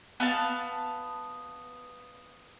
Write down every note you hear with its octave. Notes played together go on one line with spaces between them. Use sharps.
B3 F5 A5